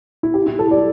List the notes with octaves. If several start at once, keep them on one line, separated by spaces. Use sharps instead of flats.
E4
G4
E4
A4
D5